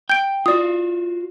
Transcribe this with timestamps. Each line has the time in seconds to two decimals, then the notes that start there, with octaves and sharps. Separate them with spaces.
0.09 G5 G6 D7
0.46 F4 F#4 D5 D#6